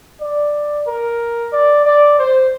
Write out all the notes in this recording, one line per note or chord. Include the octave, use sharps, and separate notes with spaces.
D5
A#4
D5
D5
C5